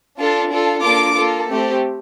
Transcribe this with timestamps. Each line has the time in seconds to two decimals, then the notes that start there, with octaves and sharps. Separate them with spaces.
0.18 D4 F4 A4
0.50 D4 F4 A4
0.83 A#3 D4 F4 A4 D6
1.15 A#3 F4 A4
1.48 A3 C4 G4